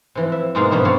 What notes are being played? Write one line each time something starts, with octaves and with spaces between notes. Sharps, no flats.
C3 E3 F3
E5
G#2 B2 G#3 A#3 D#4 F4
G2 B2 F3 G3 E4 E5
A#3 C4 C#5 D5 F5